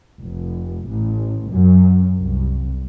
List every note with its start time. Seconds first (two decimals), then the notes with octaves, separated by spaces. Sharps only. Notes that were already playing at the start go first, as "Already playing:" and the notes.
0.22 F1
0.88 A1
1.51 F#2
2.20 C2